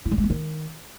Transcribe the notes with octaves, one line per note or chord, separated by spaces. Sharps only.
E4
G3
G#3
B3
D#3